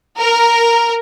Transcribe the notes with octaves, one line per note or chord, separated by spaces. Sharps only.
A#4